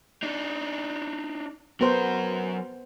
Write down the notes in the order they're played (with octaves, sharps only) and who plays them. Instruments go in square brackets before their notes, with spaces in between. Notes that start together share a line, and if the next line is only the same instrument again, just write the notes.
[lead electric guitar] D4 D#4
[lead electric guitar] F#3 A#4 [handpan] B3 C5